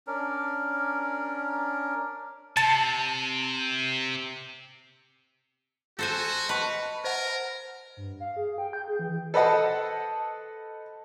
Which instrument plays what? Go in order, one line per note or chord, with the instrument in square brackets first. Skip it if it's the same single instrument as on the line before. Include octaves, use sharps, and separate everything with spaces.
[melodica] C#4 D4 A#4
[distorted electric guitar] C3 [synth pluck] A5
[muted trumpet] F#4 [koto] A4 C5 G#5
[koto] B4 [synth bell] D#5 A5 C#6
[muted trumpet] A#4 [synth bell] C5 F#5
[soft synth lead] G2
F5
G#4
G5
G6
G#4
E3
[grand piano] A4 B4 C5 D#5 F#5 A5